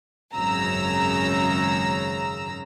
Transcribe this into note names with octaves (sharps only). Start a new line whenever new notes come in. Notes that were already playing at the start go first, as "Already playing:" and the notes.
G#1 F#2 C#3 A#5 E6